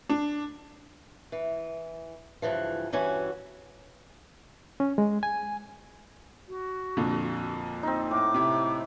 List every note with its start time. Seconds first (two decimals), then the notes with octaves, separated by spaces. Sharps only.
0.10 D4
1.32 E3
2.42 G2 C#3 E3 F3
2.93 G2 E3 C#4 F#4 G#5
4.80 C#4
4.98 G#3
5.23 G#5
6.48 F#4
6.97 F2 A#2 D3
7.83 C4 D#4
8.11 A2 D6
8.34 C3 E4